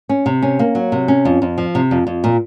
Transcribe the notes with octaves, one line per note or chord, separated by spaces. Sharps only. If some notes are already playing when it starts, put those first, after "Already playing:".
C#4
C3
C#4
A#3
F#3
C3
C#4
F2
F2
F3
C3
F2
F2
A#2